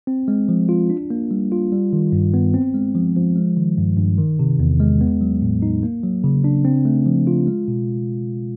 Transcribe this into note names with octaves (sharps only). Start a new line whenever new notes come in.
C4
G#3
F3
F4
D4
A#3
G3
F4
G3
D#3
G2
B3
C4
G#3
F3
F3
G#3
D#3
G2
G2
D#3
C3
E2
G#3
B3
F#3
A2
D#4
A#3
F#3
C#3
D4
C4
A3
F3
F4
G#3
B2